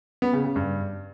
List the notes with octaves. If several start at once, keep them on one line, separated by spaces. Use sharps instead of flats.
B3
C#3
C#3
G2